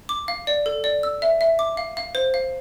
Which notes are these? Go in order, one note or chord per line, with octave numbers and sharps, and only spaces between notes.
D6
F5
D5
A4
D5
E6
E5
E5
D6
F5
F5
C5
F5